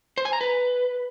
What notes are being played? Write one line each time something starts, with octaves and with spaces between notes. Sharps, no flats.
C5
G#5
A#5
B4